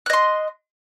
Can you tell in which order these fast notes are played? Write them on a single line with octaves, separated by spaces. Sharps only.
F#6 D#5 C6